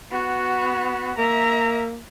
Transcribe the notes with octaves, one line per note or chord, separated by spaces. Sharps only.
B3 F#4
A#3 E5 A#5